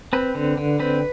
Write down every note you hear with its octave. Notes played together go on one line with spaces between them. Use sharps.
C4 B4
D3
D3
C4 B4